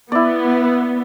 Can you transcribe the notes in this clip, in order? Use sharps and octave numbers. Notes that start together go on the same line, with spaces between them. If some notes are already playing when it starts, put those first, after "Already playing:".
B3 E4 D5